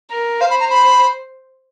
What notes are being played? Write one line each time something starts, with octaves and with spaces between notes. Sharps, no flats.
A#4
C5 F5
B5
A#5
B5